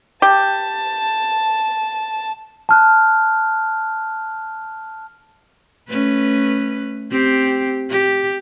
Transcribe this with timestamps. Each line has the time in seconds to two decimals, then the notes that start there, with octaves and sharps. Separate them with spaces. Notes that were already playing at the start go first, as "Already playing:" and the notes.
0.22 G4 A5
2.69 A5 F6 F#6
5.89 A3 C#4 B4
7.11 C4 G4
7.90 G4